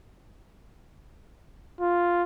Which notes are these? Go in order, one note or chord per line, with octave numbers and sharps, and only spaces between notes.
F4